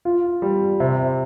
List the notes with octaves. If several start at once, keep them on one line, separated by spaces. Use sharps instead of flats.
F4
G3
C3